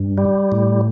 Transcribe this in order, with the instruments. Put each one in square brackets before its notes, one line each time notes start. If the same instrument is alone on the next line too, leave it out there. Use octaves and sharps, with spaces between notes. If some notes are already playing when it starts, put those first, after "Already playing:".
Already playing: [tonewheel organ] G2
G3
A2